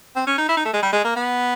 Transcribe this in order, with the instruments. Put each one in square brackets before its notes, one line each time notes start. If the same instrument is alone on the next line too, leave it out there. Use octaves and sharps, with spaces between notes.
[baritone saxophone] C4
C#4
D#4
E4
D#4
A3
G#3
G3
G#3
A#3
B3